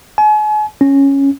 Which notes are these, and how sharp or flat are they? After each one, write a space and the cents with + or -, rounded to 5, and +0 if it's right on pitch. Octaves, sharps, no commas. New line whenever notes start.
G#5 +40
C#4 -5